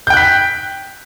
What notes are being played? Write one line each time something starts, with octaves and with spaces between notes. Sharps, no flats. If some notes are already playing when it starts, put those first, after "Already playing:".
G5 F#6 G6 B6